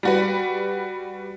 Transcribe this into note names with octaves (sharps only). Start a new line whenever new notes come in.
G3 F#4 B4